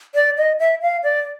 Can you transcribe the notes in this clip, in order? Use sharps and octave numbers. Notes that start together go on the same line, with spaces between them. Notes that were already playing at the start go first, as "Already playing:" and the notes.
D5
D#5
E5
F5
D5